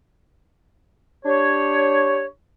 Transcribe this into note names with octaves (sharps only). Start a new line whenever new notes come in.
D4 G4 C#5